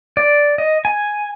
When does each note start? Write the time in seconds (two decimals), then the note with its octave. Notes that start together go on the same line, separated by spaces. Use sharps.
0.17 D5
0.58 D#5
0.85 G#5